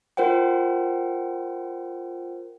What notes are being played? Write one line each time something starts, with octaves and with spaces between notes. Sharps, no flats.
F4 A#4 C5 F#5 G5